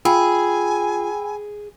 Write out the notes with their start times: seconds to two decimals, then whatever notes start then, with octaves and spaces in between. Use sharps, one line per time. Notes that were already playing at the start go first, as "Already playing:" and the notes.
0.05 F4 G#4 G5 G#5 B5 E6